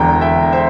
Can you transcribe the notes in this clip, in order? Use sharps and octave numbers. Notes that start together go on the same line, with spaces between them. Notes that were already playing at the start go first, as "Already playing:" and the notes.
Already playing: E1 E2 D3 G5 A#5
E5 G5
C5 E5